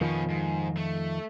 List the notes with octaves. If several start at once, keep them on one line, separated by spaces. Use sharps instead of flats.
F2 B2 D#3 F3 C#4
G#2
A3